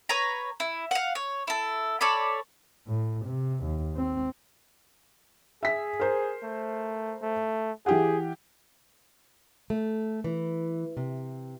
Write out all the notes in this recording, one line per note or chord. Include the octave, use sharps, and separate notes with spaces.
B4 C#5 A#5
E4
F5 F#5
C#5
E4 A4
A4 C#5 D5 B5
A2
C3
D#2
C4
G#4 E5 B6
A#4 C5
A3
A3
E3 G4 G#4 F#5
A3
E3
C3